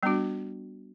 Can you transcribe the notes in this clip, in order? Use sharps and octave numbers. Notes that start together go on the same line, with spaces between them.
G3 B3 D4 F#4